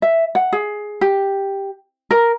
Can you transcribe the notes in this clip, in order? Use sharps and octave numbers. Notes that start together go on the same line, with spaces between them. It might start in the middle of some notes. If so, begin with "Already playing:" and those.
E5
F#5
G#4
G4
A#4